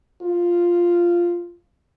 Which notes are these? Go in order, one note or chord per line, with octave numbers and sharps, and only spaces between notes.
F4